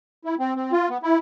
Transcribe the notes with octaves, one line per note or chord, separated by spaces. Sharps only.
E4
C4
C4
F4
B3
E4